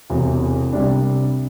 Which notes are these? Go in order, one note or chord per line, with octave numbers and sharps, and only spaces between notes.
E1 E2 C3 E3
C2 C3 G3 D4